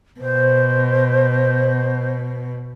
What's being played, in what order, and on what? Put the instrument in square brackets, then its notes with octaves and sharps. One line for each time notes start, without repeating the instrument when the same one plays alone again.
[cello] B2 [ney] C5